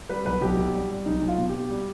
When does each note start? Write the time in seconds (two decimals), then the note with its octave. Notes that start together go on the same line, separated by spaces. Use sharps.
0.09 G3 B4
0.25 B1 B4
0.41 B1 G4
0.57 B1
0.74 G3
0.91 G3
1.06 B1 D#4
1.22 B1
1.28 F4
1.38 B2
1.49 G4
1.55 B2
1.70 G3